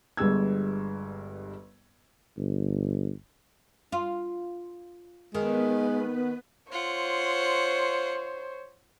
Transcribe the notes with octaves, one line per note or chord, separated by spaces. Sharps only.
G1 G2 G#3 E6 G#6
G1
F4
D#3 G#3 B3 B4
F4 C5 C#5 F#5